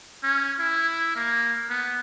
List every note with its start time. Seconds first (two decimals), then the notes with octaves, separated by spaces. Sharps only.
0.23 C#4
0.59 E4
1.16 A#3
1.69 B3